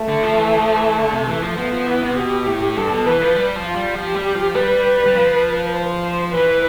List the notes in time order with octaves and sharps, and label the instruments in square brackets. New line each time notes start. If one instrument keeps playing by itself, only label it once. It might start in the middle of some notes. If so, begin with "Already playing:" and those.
Already playing: [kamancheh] A3
[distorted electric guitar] D3
F3
E3
F3
E3
D3
C3
E3
F3
[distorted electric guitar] F3 [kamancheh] B3
[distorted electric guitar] F3
E3
C3
[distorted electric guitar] B2 [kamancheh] G4
[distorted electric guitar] A2
[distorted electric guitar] G2 [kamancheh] A4
[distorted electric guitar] B2
[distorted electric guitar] E3 [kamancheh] B4
[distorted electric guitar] F3
G3
F3
[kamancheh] F4
[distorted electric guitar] G3
[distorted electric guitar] F3 [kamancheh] G4
[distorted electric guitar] G3
F3
[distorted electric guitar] G3 [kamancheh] B4
[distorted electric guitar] G3
F3
[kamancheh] C5
[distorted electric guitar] E3 [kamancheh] B4